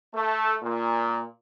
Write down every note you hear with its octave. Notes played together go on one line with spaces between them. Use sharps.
A3
A#2